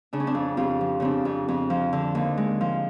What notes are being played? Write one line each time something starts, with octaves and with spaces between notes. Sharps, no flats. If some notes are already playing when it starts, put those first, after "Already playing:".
C#3 D4
C#4
C4 D4
F2
F2 F4 G4
F3
C#3 C4 D4
F2
F2
F3
D3
D#2
G#3
F3